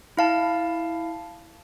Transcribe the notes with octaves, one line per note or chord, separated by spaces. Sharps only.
E4 F5 A5